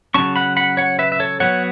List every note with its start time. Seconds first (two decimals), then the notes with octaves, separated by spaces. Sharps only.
0.14 C#3 F#3 C#4 A5 C#6
0.36 F#5 B5
0.57 F#5 B5
0.77 C#5 F#5
0.99 B4 E5
1.12 E5
1.20 A4 C#5
1.40 F#3 B3 C#5 F#5